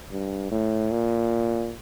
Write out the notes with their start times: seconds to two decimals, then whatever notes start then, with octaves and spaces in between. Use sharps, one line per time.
0.12 G2
0.51 A2
0.91 A#2